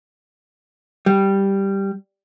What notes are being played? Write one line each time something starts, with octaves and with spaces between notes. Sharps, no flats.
G3